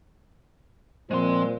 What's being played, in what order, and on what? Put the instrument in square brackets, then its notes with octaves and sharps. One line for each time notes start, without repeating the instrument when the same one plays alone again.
[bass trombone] A#2 [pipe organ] F3 C4 [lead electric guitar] G#3 C6